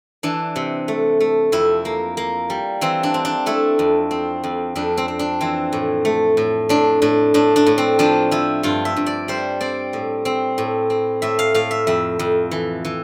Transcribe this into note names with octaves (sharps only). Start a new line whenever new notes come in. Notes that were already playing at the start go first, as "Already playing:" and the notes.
E3 D4
C3
A3
A3
F2 E4
A#3
A#3
G3
E3 C4
D4
C4
D4
A3 E4
F2
C4
F2
F2 D4
C4
C4
D4
E3 C4
A2
A3
A2
A2 D4
A2 D4
A2 D4
D4
A2
C4
F3 D4
F3 E4
G2 F4
E5
G2
D5
G3 C5
C4 D5
A2
C4
A2
C4
A2 E5
F5
A2 F5
E5
F2 E5
F2
E3
E3